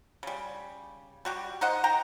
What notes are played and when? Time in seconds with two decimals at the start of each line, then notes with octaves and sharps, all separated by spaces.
0.23 C#3 G3
1.25 G3 F#4 G4
1.61 D#4 C5 D#5 F#5
1.84 G5 A#5